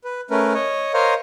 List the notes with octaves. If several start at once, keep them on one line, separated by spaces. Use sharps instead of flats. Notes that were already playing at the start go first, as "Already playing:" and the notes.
B4
A3 C#4 A#4 B4
C#5 D#5
A#4 C5 C#5 D#5 F5